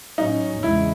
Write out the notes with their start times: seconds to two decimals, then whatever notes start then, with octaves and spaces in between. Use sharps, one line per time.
0.18 A2 F#3 C#4 D#4
0.63 E2 C#3 G#3 E4